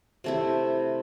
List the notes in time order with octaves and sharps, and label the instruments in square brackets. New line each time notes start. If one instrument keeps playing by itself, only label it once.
[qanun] C3 A3 E4